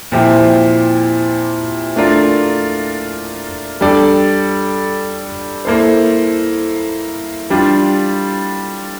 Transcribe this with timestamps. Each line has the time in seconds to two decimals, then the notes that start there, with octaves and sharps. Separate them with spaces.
0.12 A#2 F3 C4 E4 G4
1.96 A3 D4 F4 A#4 D5
3.81 G3 D4 A4 D5
5.65 A#3 E4 A4 C5
7.50 G3 D4 F4